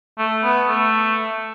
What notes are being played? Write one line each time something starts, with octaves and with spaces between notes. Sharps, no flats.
A3
B3
A3